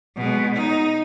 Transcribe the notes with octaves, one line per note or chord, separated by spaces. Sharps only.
B2 G#3
D#4